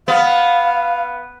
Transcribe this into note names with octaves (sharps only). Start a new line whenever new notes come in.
B3 F5